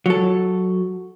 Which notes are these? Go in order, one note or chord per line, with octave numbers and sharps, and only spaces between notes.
F#3 A4